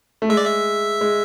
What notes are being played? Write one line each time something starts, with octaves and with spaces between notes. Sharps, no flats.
A3
G#3 E5
D5
E5
G#3